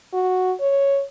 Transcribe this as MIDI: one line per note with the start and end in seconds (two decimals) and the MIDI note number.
0.13 0.52 66
0.60 1.03 73